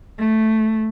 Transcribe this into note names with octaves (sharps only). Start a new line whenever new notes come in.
A3